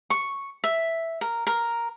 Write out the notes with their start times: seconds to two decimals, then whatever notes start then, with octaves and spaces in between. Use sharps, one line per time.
0.10 C#6
0.64 E5
1.21 A#4
1.47 A#4